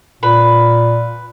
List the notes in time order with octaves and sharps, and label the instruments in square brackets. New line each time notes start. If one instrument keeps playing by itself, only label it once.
[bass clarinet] A#2 [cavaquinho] B4 B5